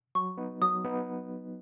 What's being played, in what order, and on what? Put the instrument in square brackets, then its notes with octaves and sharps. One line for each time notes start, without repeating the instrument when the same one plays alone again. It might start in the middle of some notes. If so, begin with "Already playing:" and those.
[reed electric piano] F#3 [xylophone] C#6
[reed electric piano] B3 D#4
[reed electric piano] F#3 [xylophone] D#6
[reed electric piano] B3 D#4